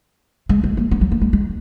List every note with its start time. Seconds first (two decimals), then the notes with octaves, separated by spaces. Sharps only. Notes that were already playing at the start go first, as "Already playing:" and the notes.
0.49 G#3
0.64 G#3
0.77 A#3
0.91 B3
1.01 F#3
1.12 A#3
1.21 G#3
1.33 G#3